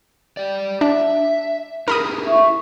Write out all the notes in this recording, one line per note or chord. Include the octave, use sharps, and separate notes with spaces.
G4 D5
D4 E5
D#4 G4 G#4 A#4 B5 D#6
E4 E5 C#6